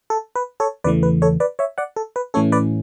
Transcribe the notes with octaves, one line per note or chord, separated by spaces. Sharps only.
A4
B4
A4 C#5
E2 C#3 E3 A3 B4 D5
B4
A4 C#5
B4 D5
C#5 E5
D5 F#5
A4
B4
A2 E3 A3 C#4 A4 C#5
B4 D5